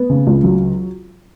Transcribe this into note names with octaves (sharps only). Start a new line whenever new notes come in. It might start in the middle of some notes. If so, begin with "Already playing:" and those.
Already playing: B3
C#3
C#2
F#3